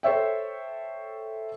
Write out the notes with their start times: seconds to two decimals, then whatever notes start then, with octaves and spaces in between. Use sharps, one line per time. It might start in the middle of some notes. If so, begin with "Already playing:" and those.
0.03 A4 C5 C#5 E5 G5